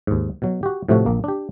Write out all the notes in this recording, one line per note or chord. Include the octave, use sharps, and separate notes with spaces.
D#2 G#2
B2 F#3
F#4 G4
A2 C3 F3 A3 F#4
A#1 A#3
D4 G4